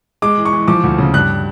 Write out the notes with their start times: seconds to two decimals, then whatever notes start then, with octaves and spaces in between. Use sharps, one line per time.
0.22 G#3 D6
0.37 E3
0.45 C#6
0.53 E3
0.68 F3 D6
0.83 D2
0.98 C#3
1.13 G2 F#6